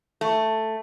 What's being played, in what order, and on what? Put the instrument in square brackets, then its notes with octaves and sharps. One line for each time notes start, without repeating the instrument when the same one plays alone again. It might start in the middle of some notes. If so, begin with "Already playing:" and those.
[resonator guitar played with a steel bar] A3